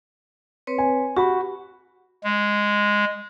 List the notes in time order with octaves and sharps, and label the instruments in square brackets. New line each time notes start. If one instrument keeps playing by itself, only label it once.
[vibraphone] C4 B4 C#5
[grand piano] G#5
[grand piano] F#4 B5 [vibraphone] G4
[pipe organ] G#3